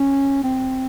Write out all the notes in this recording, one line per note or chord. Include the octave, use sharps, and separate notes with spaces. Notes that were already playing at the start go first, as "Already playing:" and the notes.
Already playing: C#4
C4